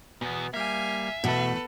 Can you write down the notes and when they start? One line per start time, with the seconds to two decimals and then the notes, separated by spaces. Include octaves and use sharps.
0.21 E2 B2 B3
0.54 G3 A#3 E5 F5 G#5
1.24 E2 B2 A3 A4 B4